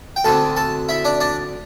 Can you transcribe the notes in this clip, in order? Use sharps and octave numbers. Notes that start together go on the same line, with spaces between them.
G5
D2 D3 C4 A4 A5
A4 A5
E4 E5
D4 D5
D4 D5